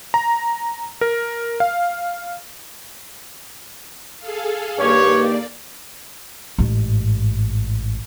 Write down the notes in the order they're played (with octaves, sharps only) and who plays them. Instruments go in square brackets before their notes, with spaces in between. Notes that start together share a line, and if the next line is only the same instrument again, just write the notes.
[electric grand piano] A#5
A#4
F5
[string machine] G#4 A4 F5
[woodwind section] G2 D#3 G4 [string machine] A#3 D5 [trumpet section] C#5
[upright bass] A1 G#2